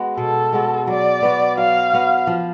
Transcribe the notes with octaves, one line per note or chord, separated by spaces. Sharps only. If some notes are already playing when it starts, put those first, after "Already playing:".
Already playing: G#3 B3 F#4
B2 A4
G#3 B3 F#4
F#3 D5
B3 F#4
F#3 F5
B3 F#4
F3